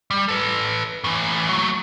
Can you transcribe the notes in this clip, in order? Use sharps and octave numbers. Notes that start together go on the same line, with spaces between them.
G3
A4 B4
A2 E3
F#3 A3